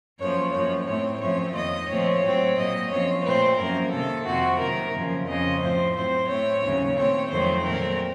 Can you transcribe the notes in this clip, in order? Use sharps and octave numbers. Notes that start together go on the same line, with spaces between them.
F#2 F3 A#3 C#5
F#2 F3 A#3 C#5
A2 A3 C4 C#5
F#2 F3 A3 C4 C#5
F2 D#3 A#3 D#5
A#2 F3 A3 C4 C#5
A2 F#3 A3 C4
A#2 F#3 A#3 D#5
F#2 F3 C4 C#5
A#2 A3 C4 C5
F#2 F3 A#3 A#4
C3 D#3 A#3 A4
F2 C3 F3 C4 F#4
C3 D#3 F#3 A#3 A#4
F#2 C#3 F3 A#3
F2 C#3 F3 C4 D#5
A2 F3 C4 C5
A2 F#3 C4 C5
A2 A3 C4 C#5
D#2 C#3 F#3
A#2 A3 C4 C#5
F2 D#3 F#3 A3 C4 C5
A#2 F#3 A3 C4 A#4